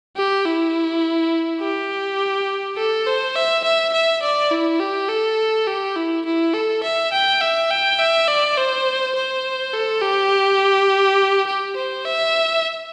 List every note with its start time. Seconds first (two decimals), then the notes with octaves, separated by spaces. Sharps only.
0.17 G4
0.45 E4
1.61 G4
2.77 A4
3.07 C5
3.36 E5
3.64 E5
3.94 E5
4.22 D5
4.51 E4
4.80 G4
5.09 A4
5.68 G4
5.96 E4
6.25 E4
6.54 A4
6.83 E5
7.12 G5
7.41 E5
7.71 G5
7.99 E5
8.28 D5
8.58 C5
9.15 C5
9.73 A4
10.02 G4
11.47 G4
11.76 C5
12.05 E5